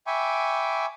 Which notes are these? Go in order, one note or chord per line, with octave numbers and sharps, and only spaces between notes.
E5 G5 G#5 B5 C#6 D6